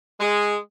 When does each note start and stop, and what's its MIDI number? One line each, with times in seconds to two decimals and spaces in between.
0.20 0.56 56